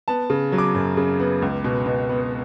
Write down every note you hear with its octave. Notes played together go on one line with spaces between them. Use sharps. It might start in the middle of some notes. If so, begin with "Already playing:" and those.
B3 A5
C#3
F#3
D6
F#2
C#3
B3
C#2
B2
B2
B3